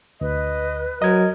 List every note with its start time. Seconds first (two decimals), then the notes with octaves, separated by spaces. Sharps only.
0.21 D2 B4 D#5
1.02 F#3 A#4 D#5 G#6